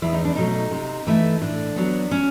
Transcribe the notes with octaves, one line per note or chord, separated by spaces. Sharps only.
E2 E4
D#4
D4
B2 F#3 A3 D#4
C3
E3 A3
A2 D4
F#3 B3
C#4